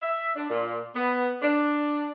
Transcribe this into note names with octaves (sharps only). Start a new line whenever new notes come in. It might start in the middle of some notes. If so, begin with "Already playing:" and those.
E5
D4
A#2
B3
D4